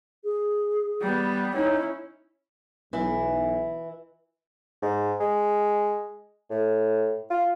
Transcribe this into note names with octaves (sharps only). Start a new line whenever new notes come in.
G#4
G3 B3
C#4 D#4 E4
B1 E3 E4
G#2
G#3
A2
F4